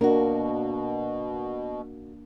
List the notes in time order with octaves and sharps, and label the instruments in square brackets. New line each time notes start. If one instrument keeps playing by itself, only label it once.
[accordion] B2 [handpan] A#3 D4 [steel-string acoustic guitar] F#4 A#4